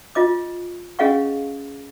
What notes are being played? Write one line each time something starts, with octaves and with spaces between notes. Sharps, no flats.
F4 D#5 D6
C#4 G#4 D#5 F5 F#5 C#6